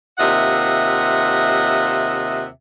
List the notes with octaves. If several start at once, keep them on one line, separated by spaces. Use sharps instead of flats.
D#2 C3 F4 D#5 E5 F#5